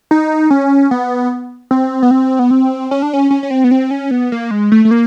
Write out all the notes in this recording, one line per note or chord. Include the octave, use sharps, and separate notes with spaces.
D#4
C#4
B3
C4
B3
C4
B3
C4
C#4
D4
C#4
C#4
C#4
C4
B3
C4
C#4
B3
A#3
G#3
A3
A3
A#3